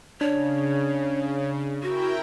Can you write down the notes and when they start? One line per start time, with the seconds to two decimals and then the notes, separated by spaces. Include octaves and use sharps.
0.21 C#3 D4 C#5
1.83 E4 F#4 A#4 G5